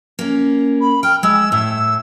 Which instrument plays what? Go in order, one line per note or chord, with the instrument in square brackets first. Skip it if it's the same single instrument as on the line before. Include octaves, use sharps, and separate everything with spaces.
[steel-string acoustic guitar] A#3 C#4
[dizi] B5
[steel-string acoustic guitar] G5 [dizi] F6
[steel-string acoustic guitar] G#3 [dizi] E6
[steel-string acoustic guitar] A2 [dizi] E6